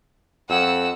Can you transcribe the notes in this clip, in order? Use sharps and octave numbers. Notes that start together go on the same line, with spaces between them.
F2 F#5 E6